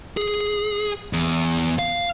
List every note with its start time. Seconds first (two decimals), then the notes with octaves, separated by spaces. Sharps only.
0.17 G#4
1.13 E2
1.79 F5